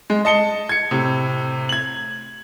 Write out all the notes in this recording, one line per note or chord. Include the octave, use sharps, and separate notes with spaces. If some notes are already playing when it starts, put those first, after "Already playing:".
G#3
D#5 A5 C#7 G7
G#6 C#7
A2 C3
G#6 F#7